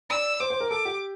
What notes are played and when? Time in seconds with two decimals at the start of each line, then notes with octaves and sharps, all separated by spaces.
0.10 D5 E6
0.40 C5 D6
0.50 C5
0.60 A#4
0.70 A4 D6
0.85 G4